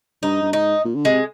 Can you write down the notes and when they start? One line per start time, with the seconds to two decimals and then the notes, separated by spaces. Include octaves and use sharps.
0.23 G2 D#4
0.42 G2
0.53 G#2 D#4
0.85 A#2
0.95 D3
1.05 C3 G#3